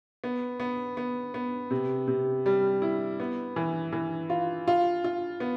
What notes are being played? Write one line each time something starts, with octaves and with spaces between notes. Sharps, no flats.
B3
B3
B3
B3
C3
C3
G3
E4
B3
E3
E3
F4
F4
F4
B3